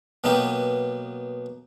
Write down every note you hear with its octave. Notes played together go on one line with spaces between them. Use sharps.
B2 F#3 A#3 B3 D#4 G4